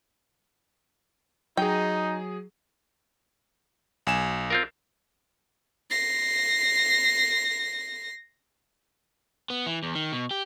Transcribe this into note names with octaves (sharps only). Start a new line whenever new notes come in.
F#3 D#4 G#4 G5
B1 G#5 E7
C4 F4 A#4
A#6 C7
B3
E3
E2
D#3
B2
G4